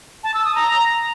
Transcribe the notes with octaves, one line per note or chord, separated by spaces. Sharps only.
A5
E6
D#6
A#5